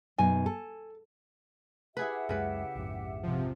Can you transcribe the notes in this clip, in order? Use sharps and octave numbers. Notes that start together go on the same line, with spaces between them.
F#2 B2 D#4 G#5
A4
E4 G4 G#4 B4 E5 F#5
C#2 F#2 C#3 G#3 B4
A#1 F2 G#2
C3 F3